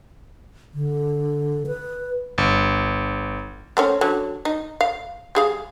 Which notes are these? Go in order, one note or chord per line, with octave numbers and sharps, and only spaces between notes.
D3
B4
G1
A3 C4 C#4
D3 F#3
D#4
F5
G3 G#4 F5